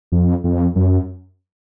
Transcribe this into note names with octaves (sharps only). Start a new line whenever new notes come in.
F2
F2
F#2